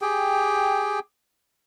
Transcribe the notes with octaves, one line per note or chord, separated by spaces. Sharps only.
G4 G#4 G5